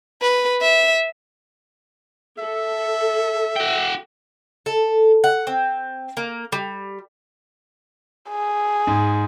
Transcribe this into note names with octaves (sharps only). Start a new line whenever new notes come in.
B4
E5
A4 E5
F#4 G5
A4
F#5
C4
A#3
G3
G#4
G#2